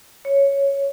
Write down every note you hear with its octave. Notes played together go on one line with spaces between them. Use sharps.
C#5